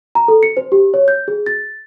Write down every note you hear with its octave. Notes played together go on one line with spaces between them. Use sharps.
A#5
A4
C#7
C5
G4
C#5
G6
G#4
A6